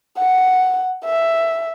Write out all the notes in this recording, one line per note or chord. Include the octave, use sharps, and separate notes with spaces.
F#5
E5